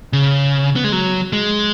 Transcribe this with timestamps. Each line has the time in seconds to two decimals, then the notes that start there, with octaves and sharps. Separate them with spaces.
0.13 C#3
0.76 B3
0.84 G#3
0.92 F#3
1.33 G#3